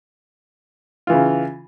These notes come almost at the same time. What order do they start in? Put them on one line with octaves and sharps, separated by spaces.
F4 E3 C#3